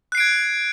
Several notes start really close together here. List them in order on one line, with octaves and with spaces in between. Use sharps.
F#6 C7 D7 G#6